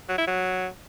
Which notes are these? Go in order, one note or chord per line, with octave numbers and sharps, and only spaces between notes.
F#3
E4
F#3